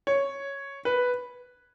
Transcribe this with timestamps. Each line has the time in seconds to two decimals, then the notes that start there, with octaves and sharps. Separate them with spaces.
0.07 C#5
0.85 B4